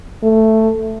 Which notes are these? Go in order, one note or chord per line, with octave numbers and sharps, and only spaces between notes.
A3